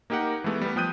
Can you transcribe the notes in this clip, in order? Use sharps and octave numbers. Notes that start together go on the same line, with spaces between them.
A#3 D#4 G4 A#4 F#5
E3 G#3 A3 B3
G3 B3
F3 G5 D#6 F#6 G6 D#7